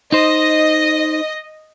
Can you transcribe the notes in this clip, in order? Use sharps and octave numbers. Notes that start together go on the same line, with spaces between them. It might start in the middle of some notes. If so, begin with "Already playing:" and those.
D#4 C5 D#5